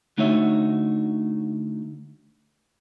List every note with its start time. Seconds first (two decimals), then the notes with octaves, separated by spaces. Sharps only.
0.18 D3 A3 D#4 F#4 C#5 E5